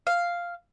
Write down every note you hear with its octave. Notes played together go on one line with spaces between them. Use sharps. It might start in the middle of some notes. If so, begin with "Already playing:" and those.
F5